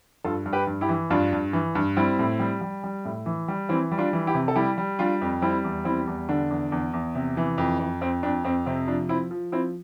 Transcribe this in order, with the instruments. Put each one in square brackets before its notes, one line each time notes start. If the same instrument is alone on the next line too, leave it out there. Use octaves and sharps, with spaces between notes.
[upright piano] G2 F4 A4
G2
G4 B4
G2
E4 G4
E3
G2 D4 F4
G2
E3
G2
G3 C4 E4
A2
G3
G3
G3
A2
E3
G3
E3 C4 E4
G3
D4 F4
E3
E4 G4
C3
A4
G3 E4 G4
G3
G3 D4 F4
F2
G3 C4 E4
E2
G3 C4 E4
E2
D3 D4
E2
E2
E2
C3
E3
F2
F2
F2 C4
F2 D4
F2 C4
C3 C4
F3 D4
F3 C4 E4
F3
F3 C4 E4